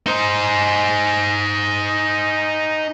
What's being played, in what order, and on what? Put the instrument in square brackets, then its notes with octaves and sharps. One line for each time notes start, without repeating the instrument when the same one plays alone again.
[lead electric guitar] D#4 C5